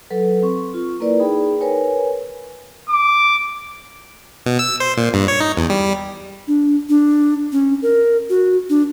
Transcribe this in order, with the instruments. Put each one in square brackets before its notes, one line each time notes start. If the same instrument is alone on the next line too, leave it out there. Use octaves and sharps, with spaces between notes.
[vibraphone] F#3 A4 B4
C4 C#6
F4
A#3 E4 A#4 B4 D5
D#4 G#4 G5 B5
A#4 B4 C#5 G#5
[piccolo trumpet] D6
[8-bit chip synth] B2
E6
C5
A#2
G2
C#5
D#4
E2
G3
[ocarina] D4
D4
C#4
A#4
F#4
D4